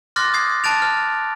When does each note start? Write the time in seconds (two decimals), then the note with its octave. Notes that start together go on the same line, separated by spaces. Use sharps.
0.16 C6 D6 F6 F#6 A6 A#6
0.34 D#6 G#6 C7
0.64 A5 F#6 G#6 A6 D7 F7
0.82 F6